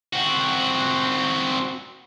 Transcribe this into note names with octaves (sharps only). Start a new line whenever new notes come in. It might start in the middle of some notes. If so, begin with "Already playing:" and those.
C4 F#4